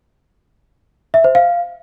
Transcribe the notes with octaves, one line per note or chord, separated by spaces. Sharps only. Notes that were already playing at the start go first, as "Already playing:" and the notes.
E5
C5
F5